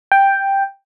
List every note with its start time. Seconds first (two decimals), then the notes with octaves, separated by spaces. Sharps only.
0.12 G5